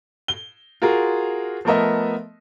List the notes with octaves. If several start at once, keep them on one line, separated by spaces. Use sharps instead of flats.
G7
F4 F#4 G#4 A#4
F3 A3 B3 A#4 D#5 E5